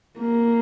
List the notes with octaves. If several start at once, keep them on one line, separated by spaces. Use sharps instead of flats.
A#3